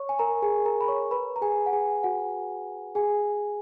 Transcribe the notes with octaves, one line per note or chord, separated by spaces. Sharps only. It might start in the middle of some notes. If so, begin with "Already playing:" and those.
Already playing: C#5 C#6
G#5
A#4 A#5
G#4 G#5
A#4 A#5
B5
C#5 C#6
B4 B5
A#5
G#4 G#5
F#5
G#4 G#5
F#4 F#5
G#4 G#5